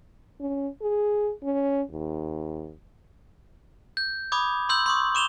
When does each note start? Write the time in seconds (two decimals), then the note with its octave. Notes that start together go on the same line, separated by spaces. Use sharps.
0.41 C#4
0.82 G#4
1.43 C#4
1.90 D#2
3.97 G6
4.32 B5 D6 D#6 G#6
4.69 C6 E6 G6 F#7
4.86 C6 C#6 D#6
5.15 D6 E7 F7 G7